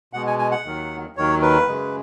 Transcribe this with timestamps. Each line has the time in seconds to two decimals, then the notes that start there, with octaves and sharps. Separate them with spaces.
0.13 B2 G#3 F#5
0.27 G#5
0.39 G#5
0.51 F#5
0.65 D#2 D#3 F#3
1.16 D#2 D#3 F#3 C#5
1.42 B4
1.67 F#2 C#3 G#3